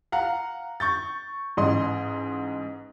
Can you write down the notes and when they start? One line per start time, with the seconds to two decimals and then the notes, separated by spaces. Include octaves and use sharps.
0.12 F5 F#5 A#5
0.80 C#6 G6 A6
1.57 A1 G#2 D#5 C6